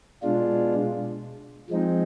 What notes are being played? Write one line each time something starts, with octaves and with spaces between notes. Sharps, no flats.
B2 G#3 D4 F4
F3 G#3 C4 D#4